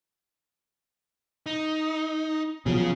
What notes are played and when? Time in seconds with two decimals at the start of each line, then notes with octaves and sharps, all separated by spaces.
1.46 D#4
2.66 B2 F3 F#3 C#4 G#4